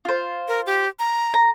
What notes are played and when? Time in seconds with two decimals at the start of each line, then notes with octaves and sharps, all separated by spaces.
0.05 F4 C5
0.48 A#4
0.66 G4
0.99 A#5
1.34 A#5